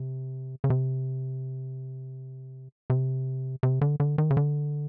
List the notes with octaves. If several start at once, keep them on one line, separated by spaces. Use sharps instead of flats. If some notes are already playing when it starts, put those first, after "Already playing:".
Already playing: C3
C#3
C3
C3
C3
D3
D3
D#3
C#3
D3